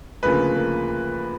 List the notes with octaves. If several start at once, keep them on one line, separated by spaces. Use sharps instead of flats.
D2 C#3 F3 A#3 B4
A#3